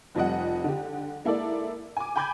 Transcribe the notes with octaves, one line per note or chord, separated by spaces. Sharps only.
F1 F2 F3 G3 D#5 F#5
D3 G4
G#3 A#3 E4 A4 D5
G#5 D6
G5 G#5 B5 D6 G6 G#6